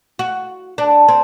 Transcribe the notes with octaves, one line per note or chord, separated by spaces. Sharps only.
F#4
D4
C4